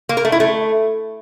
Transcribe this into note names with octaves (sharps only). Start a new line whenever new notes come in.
A#3
A#4
A3
E4
A3